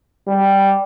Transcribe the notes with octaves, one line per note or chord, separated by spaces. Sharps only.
G3